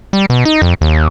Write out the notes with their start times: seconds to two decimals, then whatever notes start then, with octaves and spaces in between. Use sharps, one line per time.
0.13 G3
0.30 B2
0.45 D#4
0.62 F2
0.81 D#2